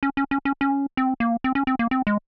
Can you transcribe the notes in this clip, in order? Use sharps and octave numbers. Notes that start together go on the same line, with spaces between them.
C#4
C#4
C#4
C#4
C#4
C4
A#3
C4
C#4
C4
A#3
C4
G#3